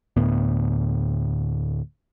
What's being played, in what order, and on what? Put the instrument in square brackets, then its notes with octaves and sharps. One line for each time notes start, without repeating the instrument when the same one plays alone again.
[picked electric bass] D2 A2 B3